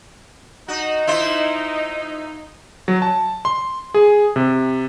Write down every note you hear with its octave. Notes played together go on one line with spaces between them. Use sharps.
D#4 F#4
E4 F4 C5
F#3
A5
C6
G#4
C3